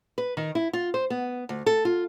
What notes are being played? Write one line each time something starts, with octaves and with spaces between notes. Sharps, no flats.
B4
D#3
E4
F4
C5
B3
D2
A4
F4